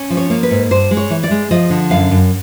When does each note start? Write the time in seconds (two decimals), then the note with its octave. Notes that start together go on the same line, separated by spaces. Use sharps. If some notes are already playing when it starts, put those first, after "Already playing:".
Already playing: C#4
0.10 F3
0.17 C#5
0.30 A#3
0.43 B4
0.51 G#2
0.71 G2 C5
0.91 G#3
0.97 C#5
1.10 E3
1.24 D5
1.31 G#3
1.51 F3 D#5
1.70 D3
1.90 F#2 F5
2.11 F#2